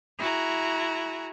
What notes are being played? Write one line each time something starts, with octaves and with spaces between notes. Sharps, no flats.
E4 F#4 G#4 A#5